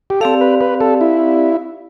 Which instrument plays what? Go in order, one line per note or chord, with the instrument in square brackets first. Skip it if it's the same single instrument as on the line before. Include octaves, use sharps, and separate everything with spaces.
[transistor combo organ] G4
[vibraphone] C4 G4 D5 F5 [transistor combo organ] A4
[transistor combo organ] B4
B4
A4
E4